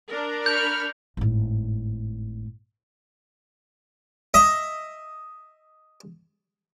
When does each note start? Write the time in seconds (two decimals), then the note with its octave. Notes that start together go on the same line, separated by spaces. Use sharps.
0.11 D4 A#4
0.46 B5 C#6 F6 G6
1.17 G#1 A2
4.34 D#5 E5 D#6